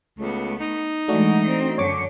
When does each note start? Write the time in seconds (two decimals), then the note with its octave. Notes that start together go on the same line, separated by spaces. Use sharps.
0.19 C#2 A3 B3
0.60 D#4
1.08 E3 G#3 A3 D4 F#4
1.47 C4
1.78 F#2 D3 C#5 D6 C#7